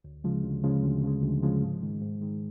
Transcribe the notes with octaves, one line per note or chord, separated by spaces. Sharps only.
D2
C#3 F3 G#3
D2
C#3 F3 G#3
D2
C#3 F3 G#3
D2
C#3 F3 G#3
G#2
D#3 G#3
G#2
D#3 G#3